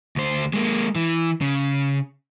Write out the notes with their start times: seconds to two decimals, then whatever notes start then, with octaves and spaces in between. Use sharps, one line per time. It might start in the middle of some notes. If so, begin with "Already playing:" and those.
0.16 D2 C5
0.53 G#3 A#3
0.95 E3
1.41 C#3